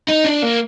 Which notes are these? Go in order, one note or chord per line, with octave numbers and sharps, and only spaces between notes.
D#4
D4
A#3